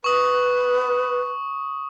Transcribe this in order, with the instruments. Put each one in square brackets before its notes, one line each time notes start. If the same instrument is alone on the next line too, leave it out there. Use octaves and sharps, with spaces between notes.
[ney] B4 [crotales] C#6 D#6